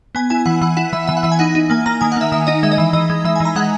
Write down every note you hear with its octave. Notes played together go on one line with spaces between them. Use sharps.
B3 G#5
E4 G#5
E3 F#5
E3 F#5
E4 F#5
E3 E5
E3 E5
F#5
E3 E5
G#5
D#4 F#5
D#4
A#3 G#5
A#3 A#5
D#3 G#5
F#5
A#3 E5
D#3 E5
D#4 D#5
G#3 E5
D#5
E3 E5
E3 D#5
G#3
E3 E5
G#5
E3
A#5
G#3 F#5